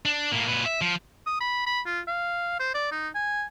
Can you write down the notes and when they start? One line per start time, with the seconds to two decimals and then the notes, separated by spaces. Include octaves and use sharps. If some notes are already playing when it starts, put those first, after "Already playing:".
0.05 D4
0.32 A2 A#3
0.48 A#2 B4
0.66 E5
0.81 F3
1.27 D#6
1.40 B5
1.66 B5
1.86 F4
2.08 F5
2.60 C5
2.75 D5
2.92 D#4
3.15 G#5